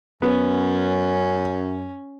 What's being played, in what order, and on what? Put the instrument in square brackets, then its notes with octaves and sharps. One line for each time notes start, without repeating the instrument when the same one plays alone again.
[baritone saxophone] F#2 [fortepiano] B3 [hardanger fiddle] C#4